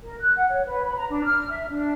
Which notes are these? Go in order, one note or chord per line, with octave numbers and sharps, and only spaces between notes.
A#4
F#6
F#5
C#5
B4
B5
A#5
D4
F6
E5
D4